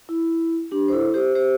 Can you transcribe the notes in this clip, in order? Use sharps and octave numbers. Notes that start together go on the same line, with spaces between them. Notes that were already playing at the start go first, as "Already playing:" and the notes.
E4
D4 G4
C5
E4 A4
G4 C5
G4 C5